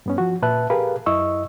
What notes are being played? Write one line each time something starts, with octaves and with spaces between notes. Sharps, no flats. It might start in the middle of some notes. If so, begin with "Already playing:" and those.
G2 B3 C#4
F3 F#4
A#2 B4 E5 A5 F#6
G4 G#4 A#4 B4 F5
F#2 E4 D#5 C#6 E6